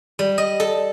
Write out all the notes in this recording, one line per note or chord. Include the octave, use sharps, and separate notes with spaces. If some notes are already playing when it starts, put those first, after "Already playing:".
G3
D#5
A4